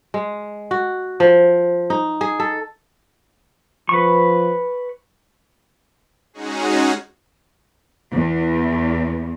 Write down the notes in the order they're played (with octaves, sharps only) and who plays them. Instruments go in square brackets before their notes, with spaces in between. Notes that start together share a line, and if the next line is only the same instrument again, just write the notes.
[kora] G#3
F#4
F3
D#4
G#4
A4
[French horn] F3 [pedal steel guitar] B4 C#6
[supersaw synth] G#3 C#4 D#4 F#4 G#4
[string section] E2